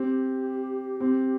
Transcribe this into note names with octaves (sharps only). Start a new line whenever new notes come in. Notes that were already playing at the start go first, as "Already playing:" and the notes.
Already playing: C4 G4
C4 G4